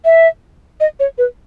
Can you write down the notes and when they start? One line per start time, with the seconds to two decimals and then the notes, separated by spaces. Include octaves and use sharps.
0.05 E5
0.80 D#5
1.00 C#5
1.18 B4